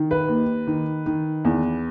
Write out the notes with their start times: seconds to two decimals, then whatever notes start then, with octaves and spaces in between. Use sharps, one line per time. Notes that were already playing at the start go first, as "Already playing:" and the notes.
Already playing: D#3
0.11 B4
0.28 D#2
0.67 D#3
1.06 D#3
1.45 E2